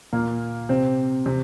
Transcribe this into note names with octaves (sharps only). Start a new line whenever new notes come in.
A#2 A#3
C3 C4
C3 C4